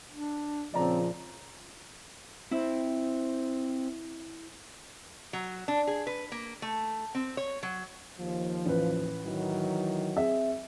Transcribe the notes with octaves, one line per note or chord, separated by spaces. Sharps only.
D4
A#2 C#3 F3 C4 D5 A5 A#5
C4 E4
F#3
D4
G#4
B4
A#3
A3
C4
C#5
F#3
D#2 F3
A1 B4
D#3 E3 F#3
C4 G#4 E5